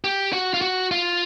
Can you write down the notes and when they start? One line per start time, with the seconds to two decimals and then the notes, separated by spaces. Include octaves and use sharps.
0.04 G4
0.33 F#4
0.54 F4
0.61 F#4
0.91 F4